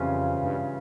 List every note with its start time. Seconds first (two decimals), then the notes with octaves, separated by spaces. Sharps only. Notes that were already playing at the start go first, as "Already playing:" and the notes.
Already playing: F2 C#3 E3 G3 C#4 F4
0.43 G2